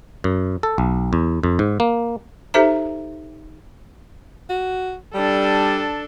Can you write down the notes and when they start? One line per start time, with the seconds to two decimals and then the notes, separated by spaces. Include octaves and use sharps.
0.24 F#2
0.63 A4
0.78 B1
1.13 E2
1.43 F2
1.59 G#2
1.80 A#3
2.54 D#4 G4 A4 C5 E5 A#5
4.50 F#4
5.14 G3 D4 A4